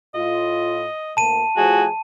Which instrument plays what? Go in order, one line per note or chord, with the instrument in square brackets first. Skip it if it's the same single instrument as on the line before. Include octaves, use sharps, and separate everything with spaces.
[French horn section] A2 F4 [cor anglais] D#5
[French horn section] D2 A#3 [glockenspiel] A5 D#7
[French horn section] A2 F3 [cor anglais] F#4 [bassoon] G#4